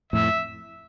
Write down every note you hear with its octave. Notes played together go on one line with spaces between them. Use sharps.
F2 A2 E5